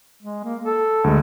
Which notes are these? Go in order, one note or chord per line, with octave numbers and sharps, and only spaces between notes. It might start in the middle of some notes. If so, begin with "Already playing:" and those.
G#3
A#3
A4
D2 G#3